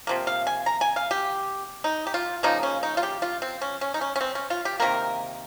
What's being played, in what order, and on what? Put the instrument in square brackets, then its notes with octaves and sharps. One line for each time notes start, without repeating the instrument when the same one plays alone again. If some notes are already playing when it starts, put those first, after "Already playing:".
[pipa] C3 F3 A#3
F5
G#5
A#5
G#5
F5
G4
D#4
G4
F4
C#3 F3 A#3 D#4
C#4
D#4
F4
G4
F4
C4
C#4
C#4
D#4
C#4
C#4
C4
C#4
F4
G4
C3 D#3 A#3 A#4